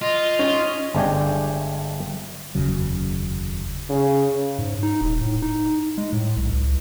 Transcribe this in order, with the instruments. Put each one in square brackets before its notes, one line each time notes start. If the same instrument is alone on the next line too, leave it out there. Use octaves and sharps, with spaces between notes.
[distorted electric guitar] F4 [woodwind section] D#5
[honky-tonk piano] C#4
[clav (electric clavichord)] G1 G#3 A3 D4 G4 G#5
[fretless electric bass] F1 D#2 C#3 F#3
[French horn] C#3
[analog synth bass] G#2
D#4
D#1
A2
D#4
G#3
A2
B1
C#2